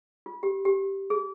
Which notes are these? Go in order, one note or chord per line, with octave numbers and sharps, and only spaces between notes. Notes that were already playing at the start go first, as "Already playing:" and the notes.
F4
G4
G4
G#4